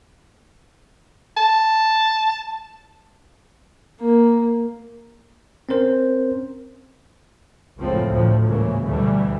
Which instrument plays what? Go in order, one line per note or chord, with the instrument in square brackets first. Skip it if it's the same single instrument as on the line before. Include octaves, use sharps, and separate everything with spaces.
[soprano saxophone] A5
[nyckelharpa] A#3
[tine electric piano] C4 C#4 A#4 C5
[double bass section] F#1 C#2 A2 F3 C4
D2 A2 F3
G#2 C#3 E3 F#3 A#3
D2 B2 D3 E3 G3 A3